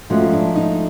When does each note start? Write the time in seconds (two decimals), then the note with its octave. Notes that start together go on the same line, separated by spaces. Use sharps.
0.10 G#2 F3 A3 C#4 F#4
0.33 D4
0.56 D#4